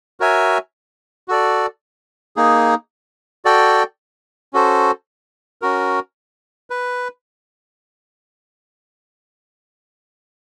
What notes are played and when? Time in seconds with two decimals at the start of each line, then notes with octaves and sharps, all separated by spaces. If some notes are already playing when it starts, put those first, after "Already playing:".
0.20 F#4 A#4 C#5 E5 G#5
1.28 F#4 A4 D5
2.36 A#3 D#4 G#4
3.45 F#4 A4 D5 G5
4.53 C#4 F#4 A4 C5
5.62 C#4 F#4 A#4
6.70 B4